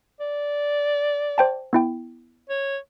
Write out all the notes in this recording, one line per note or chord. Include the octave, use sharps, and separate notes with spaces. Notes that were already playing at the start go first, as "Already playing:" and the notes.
D5
C5 G5 A5
B3 E4 G5
C#5